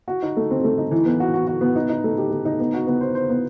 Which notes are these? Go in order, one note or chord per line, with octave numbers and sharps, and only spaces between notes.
F#4
D#4
A3
C4
A3
D#4
E3
B3
F#4
F#4
F#4
B3
D#4
D#4
A3
G4
A3
D#4
B3
F#4
B3
C5
C5
B3